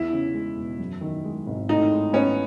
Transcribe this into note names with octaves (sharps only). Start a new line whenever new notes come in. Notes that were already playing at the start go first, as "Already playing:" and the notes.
Already playing: E2 E4
C#3
G#3
E1
F#2
D#3
G#3
G#1
A2 D#4
G#3
B3 C#4